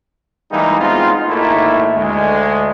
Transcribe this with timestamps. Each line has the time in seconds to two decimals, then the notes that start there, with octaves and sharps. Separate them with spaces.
0.51 E3 G3 G#3 A#3 D#4 E4
0.80 G#3 B3 C4 D#4 F4
1.28 G#1 A3 A#3 D#4 E4
1.96 D2 G#3